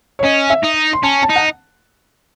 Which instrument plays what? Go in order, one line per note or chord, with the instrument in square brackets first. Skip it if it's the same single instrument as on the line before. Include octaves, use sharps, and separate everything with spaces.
[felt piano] C#5
[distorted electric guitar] C#4 [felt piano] D#5
[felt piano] E5
[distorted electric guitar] D#4
[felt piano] C6
[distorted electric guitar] C#4 [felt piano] A5
[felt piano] A5
[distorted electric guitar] D#4
[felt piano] F#5